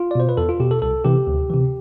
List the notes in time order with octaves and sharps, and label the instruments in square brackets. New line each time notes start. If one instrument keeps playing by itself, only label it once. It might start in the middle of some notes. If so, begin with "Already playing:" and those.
Already playing: [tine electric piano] F4
D5
B2 C5
B4
E2 A4
F4
B2 G4
A4
C2 A4
C3 E3 G4
D2
C3 E3